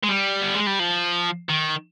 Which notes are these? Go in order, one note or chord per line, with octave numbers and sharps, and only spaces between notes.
G#3
G3
B3
G#3
G3
F3
D#3